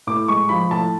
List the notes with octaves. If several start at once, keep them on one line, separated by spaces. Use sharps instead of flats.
A2 D6
G#3 C#6
F3 B5
A2 A5